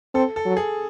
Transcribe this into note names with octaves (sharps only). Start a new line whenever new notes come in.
C4 A4
A4
F#3
G#4